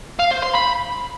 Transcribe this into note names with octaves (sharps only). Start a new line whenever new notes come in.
F5
C5
C6
B5